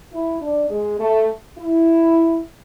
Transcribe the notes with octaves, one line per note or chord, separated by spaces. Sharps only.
E4
D4
G#3
A3
E4